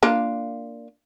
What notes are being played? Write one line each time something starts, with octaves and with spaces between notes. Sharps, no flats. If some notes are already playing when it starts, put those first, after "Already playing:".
A#3 D4 F4